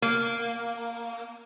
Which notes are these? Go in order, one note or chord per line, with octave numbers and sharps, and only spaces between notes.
A#3